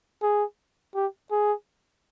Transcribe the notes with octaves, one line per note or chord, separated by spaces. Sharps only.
G#4
G4
G#4